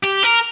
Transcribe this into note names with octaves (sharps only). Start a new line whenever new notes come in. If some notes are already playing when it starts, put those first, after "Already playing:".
G4
A#4